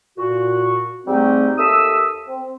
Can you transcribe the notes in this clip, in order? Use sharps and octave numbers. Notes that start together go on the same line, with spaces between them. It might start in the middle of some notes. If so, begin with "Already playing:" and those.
A#2 F#4
G#2 G3 A3 C4 D#4 G4
D#2 A4 E5 D#6 E6
C4